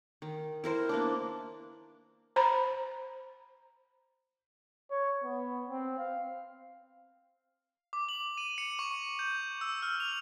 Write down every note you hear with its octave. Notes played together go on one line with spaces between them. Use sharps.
D#3
E4 A#4 C5
A#3 B3 D4
C5 A#5 B5
C#5
B3
C4
F5
D6
F#7
D#7
C#7
C#6
G6
E6
F6
F7